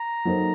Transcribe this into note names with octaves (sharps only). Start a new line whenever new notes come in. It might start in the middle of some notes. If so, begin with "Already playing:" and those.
Already playing: A#5
F#3 A#3 D#4 A4 C5